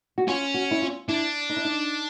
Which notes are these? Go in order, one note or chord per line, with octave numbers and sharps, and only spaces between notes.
F#4
C#4 F4
F#4
E4
F4
D4 E4
D#4
E4
D#4